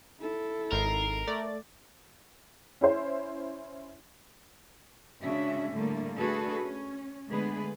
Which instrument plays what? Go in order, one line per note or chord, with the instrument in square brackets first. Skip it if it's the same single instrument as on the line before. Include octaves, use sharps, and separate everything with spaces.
[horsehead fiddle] E4 A4
[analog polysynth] G#1 D#4 C7 [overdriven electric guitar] A#4
[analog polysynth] A3 D5 A6
[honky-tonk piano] C#4 E4 C5
[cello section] C#3 G#3 C#4 D4 F#4 E5
A2 D3 G3 A3 A#3
A3 D4 F#4 G#4 A4 B4
C#4
D3 G#3 A3 B3 G#4 B4